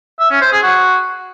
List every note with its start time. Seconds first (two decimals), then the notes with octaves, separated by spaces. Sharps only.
0.20 E5
0.31 C#4
0.41 C5
0.52 G#4
0.63 F#4